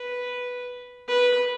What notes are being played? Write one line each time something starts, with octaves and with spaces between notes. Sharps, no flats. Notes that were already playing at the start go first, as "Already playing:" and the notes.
Already playing: B4
B4